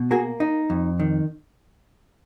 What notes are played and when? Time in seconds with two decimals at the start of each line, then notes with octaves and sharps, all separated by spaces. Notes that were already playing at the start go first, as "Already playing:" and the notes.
Already playing: B2
0.11 A#3 F#4 G#4
0.40 D#4
0.70 F2
1.00 D#3